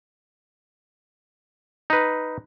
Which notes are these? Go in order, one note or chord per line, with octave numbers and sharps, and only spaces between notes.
D#4 B4